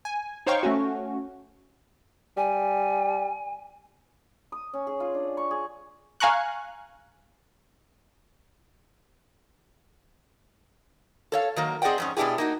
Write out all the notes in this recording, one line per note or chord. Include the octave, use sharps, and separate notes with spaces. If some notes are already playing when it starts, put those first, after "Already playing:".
G#5
D#4 C5 C#5 F5 G5 C#6
A3 C#4 F#4
G3 G#5
D#6
C#4
G#4
F4
D4
C#6
G#4
F5 G#5 A#5 C#6 F#6
A4 C#5 F5
D#3 F#3 A#3
C4 G#4 D5 D#5 F#5 G5
F2 G#2 C#4
B2 B3 D4 E4 G4 G#4
A#3 D#4 F#4